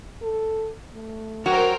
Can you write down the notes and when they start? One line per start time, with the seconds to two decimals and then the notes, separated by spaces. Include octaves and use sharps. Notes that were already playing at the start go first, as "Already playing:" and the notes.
0.22 A4
0.94 A3
1.46 F#3 F#4 A#4 C5 G5